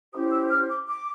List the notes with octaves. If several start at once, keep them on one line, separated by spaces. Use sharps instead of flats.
C#4 E4 G4 C5 D#6
E6
F6
D6
D6